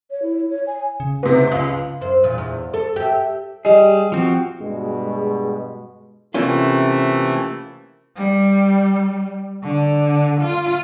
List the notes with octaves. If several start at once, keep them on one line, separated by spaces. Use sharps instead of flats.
C#5
E4
C#5
G#5
C#3
G#2 C3 B4
C#2 C6
F#2 C5
E2 A#2
E2
A4
G4 E5
G3 G4 G#4 D#5
F3 C4 F#4
G2 B2 G#3
C3 E3 A3 A#3 C#4 F4
G3
D3
F4